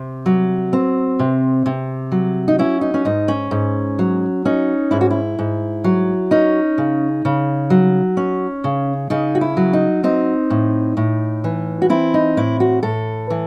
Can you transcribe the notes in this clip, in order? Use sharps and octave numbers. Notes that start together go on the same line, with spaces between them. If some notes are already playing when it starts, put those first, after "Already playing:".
Already playing: C3
F#3
C4
C3
C3
F#3
D#4
C#4 E4
D#4
C#4
G#2 D#4
C#4
G#2
F#3
C#4 D#4
G#2 E4
F#4
E4
G#2
F#3
C#4 D#4
C#3
C#3
F#3
C#4
C#3
C#3 D#4
F#4
E4
F#3
D#4
C4 D#4
A2
A2
E3
F#4
C4 E4
D#4
A2 E4
F#4
A2 A4
E3